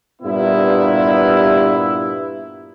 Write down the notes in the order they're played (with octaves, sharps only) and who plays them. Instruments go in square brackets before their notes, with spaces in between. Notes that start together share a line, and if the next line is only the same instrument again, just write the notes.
[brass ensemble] G2 A#2 B3 E4